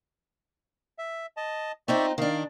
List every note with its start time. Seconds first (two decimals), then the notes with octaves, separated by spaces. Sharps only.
0.98 E5
1.37 D#5 A5
1.88 C4 D#4 F4 D5 E5 C#6
2.18 D#3 D4 F5